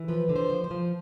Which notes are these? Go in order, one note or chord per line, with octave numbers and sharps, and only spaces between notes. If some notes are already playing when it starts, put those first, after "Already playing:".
Already playing: E3
F3 B4
D3
C5
F3
C5
F3